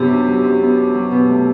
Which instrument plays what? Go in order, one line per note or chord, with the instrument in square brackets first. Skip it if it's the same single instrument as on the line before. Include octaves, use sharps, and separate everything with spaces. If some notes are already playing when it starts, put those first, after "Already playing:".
Already playing: [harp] F#2 B3 [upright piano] C3
[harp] D4
F#3
F#2
B3
D4
F#3
B2
A3